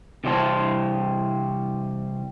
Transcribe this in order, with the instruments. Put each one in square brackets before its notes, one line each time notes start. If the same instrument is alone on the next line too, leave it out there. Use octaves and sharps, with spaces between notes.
[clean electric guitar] C3 E3 G3 C5 A5